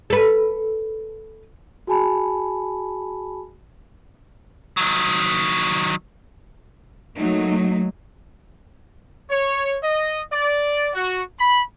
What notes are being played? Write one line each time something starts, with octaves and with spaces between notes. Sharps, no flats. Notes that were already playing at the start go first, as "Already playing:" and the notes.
A4 B4
F#4 G#4 G#5 A5 B5
D#3 F#3
F#3 A3 A#3 D#4
C#5
D#5
D5
F#4
B5